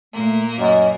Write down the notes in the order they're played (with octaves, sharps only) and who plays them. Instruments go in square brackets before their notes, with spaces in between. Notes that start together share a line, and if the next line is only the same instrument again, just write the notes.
[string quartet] A#2 A#3 [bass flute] A3
[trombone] F#2 [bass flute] D#5